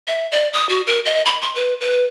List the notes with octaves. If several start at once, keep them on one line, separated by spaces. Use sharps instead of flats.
E5
D5
D#6
F#4
A#4
D#5
B5
C6
B4
B4